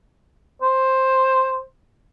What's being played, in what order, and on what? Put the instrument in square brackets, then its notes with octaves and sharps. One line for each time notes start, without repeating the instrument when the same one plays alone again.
[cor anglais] C5